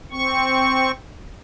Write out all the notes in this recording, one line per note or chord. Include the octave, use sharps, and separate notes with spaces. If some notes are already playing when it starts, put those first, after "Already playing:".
C4 C#6